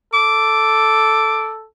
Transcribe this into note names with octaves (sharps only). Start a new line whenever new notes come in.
A4 D6